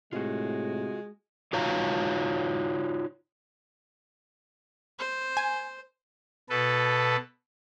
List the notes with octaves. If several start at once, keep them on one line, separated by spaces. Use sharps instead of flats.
A2 C3 G#3 F4 F#4
D#4 F4 F#4 C#5 F5 A#5
C5
G#5
B2 A4 B4